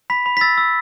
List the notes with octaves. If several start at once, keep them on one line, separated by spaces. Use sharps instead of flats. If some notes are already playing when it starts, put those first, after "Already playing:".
B5 B6
B5
B6
E6 A6
E6